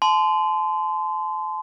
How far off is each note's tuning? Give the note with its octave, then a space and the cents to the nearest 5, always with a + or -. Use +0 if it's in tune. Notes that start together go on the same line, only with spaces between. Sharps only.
A5 -35 C6 -25